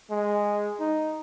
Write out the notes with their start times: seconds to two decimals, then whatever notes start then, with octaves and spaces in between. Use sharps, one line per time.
0.11 G#3
0.80 D#4